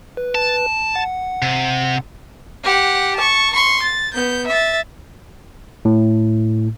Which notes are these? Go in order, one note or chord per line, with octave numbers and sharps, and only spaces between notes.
B4
A5
F#5
C3
G4 F#5
A5 C#6
C6 C#6
A6
B3 G6
E5 A6
A2